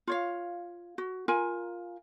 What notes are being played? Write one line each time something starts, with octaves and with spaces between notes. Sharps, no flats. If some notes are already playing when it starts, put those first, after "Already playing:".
F4 C#5 F5
F#4
F4 A#4 G#5